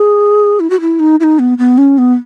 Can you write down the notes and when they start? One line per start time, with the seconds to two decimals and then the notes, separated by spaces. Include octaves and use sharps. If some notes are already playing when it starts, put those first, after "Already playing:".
Already playing: G#4
0.60 E4
0.70 F#4
0.81 E4
1.00 D#4
1.20 E4
1.24 D#4
1.39 B3
1.58 B3
1.78 C#4
1.98 B3